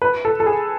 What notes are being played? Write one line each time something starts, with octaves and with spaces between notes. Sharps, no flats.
B4
A4
A4
G#4